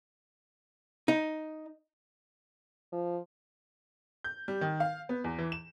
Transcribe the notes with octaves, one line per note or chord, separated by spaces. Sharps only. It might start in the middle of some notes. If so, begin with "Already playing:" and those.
D#4
F3
G6
G3
D#3
F5
B3
E2
E3
E7